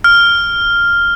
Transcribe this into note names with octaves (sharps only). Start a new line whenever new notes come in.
F6